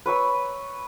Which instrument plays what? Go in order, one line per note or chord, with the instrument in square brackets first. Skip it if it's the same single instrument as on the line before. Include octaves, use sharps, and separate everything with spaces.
[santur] B4 C#5 E6